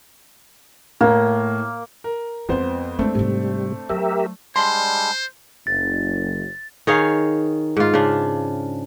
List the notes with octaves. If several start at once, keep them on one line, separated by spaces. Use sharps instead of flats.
A2 A#3
A#4
F2 G#3 B3 C#4 C5
G#3 A3 B3 C4 D4
G#2 C3 G3
F#3 G4 A#4 E5
G3 G#3 D4 C5 C6
F#1 A6
D#3 G#4 C#5 F5
G#2 F4
C#3 D4